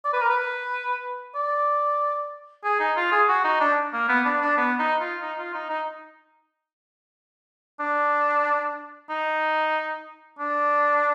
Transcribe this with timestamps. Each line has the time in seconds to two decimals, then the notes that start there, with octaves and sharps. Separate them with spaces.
0.05 D5
0.13 B4
0.21 A#4
0.29 B4
1.35 D5
2.64 G#4
2.80 D#4
2.96 F4
3.12 G#4
3.28 F#4
3.44 D#4
3.60 D4
3.93 A#3
4.09 B3
4.25 D4
4.41 D4
4.57 B3
4.79 D#4
5.00 F4
5.22 D#4
5.39 F4
5.54 D#4
5.70 D#4
7.80 D4
9.10 D#4
10.39 D4